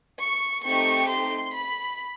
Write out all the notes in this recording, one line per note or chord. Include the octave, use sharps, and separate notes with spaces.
C#6
A3 C4 D#4 G4 C#6
C6
B5